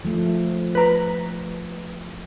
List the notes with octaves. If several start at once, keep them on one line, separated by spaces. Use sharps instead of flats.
F3 A3
B4 A#5